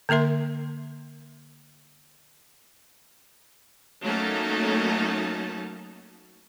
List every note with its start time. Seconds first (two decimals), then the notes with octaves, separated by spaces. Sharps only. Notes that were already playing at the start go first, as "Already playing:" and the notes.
0.09 D3 A#3 A#4 E5 C6
4.01 F#3 A3 A#3 C#4 D#4 A5